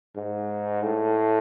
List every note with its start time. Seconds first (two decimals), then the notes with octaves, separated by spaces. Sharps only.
0.16 G#2
0.82 A2